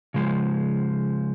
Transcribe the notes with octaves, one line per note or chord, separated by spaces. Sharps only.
C#3 F3 G#3